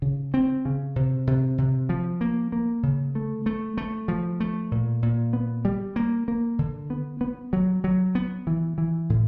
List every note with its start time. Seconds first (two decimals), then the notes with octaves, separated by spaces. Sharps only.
0.02 C#3
0.34 C4
0.65 C#3
0.96 C3
1.27 C3
1.58 C3
1.89 F3
2.21 A#3
2.52 A#3
2.83 C#3
3.15 A3
3.46 A3
3.78 A3
4.08 F3
4.40 A3
4.71 A#2
5.03 A#2
5.33 B3
5.65 G3
5.96 A#3
6.28 A#3
6.59 D3
6.90 B3
7.21 B3
7.53 F#3
7.84 F#3
8.15 B3
8.47 E3
8.78 E3
9.10 A2